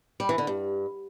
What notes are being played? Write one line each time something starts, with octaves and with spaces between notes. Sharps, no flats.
G3
E3
D3
G2